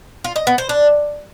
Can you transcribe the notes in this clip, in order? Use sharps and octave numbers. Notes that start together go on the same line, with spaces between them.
F4
D#5
B3
C5
D4